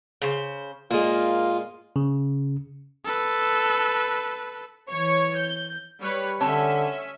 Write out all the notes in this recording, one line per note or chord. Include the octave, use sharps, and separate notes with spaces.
C#3 C5
A#2 G#3 A#3 F4
C#3
A4 B4
E3 C#5 C#6
G6
G3 B4 C#5
D3 C4 C#4 C#5 E5 A5